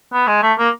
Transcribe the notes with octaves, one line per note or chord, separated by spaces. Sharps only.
B3
G#3
A3
A#3